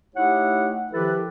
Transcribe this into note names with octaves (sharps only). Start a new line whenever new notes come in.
A3 D#4 E4 G4 C#5 F#5
D#3 F3 E4 G4 A4 B4